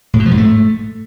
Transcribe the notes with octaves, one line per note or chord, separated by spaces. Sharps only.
A2
B2
F3
G#2
A3